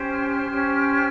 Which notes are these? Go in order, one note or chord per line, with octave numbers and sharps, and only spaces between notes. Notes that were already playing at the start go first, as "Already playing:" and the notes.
Already playing: C#4 G4 C5
F6
F6
C#4 G4 C5